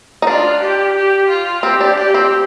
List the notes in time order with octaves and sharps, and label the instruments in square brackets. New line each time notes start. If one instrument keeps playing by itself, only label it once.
[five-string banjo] D#4
[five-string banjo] D4 [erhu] F4
[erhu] G4
G4
F4
[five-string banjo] C4 [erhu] G4
[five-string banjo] D4
[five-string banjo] D4 [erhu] G4
[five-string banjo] C4